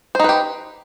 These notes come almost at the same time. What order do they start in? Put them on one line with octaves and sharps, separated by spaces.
C5 D#4 B4 G4